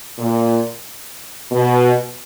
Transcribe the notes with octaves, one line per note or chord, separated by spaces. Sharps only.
A#2
B2